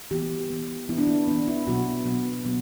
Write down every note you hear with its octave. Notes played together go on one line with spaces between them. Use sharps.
E3 B3 G4
E3 B3
E3 B3 E4
D4
E4
E3 B3 D4
E4
B2 F#3 B3 F#4
B2 F#3 B3
B2 F#3 B3